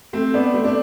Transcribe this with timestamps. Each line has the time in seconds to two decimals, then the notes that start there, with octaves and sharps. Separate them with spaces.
0.13 A3 C4
0.34 B3 D4
0.54 A3 C4
0.64 D4